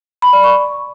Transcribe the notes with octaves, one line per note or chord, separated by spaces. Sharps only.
B5
D5
C#6